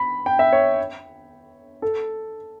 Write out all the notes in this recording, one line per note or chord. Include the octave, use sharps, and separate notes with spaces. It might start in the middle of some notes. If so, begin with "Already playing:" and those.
Already playing: B5
G5
E5
C#5
A4